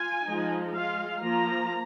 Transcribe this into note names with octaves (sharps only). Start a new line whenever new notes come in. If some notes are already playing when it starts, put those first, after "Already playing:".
Already playing: F4 G#5
F3 G#3 D#4
G#3 F4 F5
F3 A#3 F4 A#5